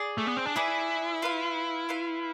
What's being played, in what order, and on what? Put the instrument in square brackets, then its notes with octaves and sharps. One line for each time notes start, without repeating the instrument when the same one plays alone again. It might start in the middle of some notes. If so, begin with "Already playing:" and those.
Already playing: [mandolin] G#4 D5
[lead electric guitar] A3
B3
C4
D4
[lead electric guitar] E4 [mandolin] G#4 B4 D5
[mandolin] F4 B4 F5
F4 B4 F5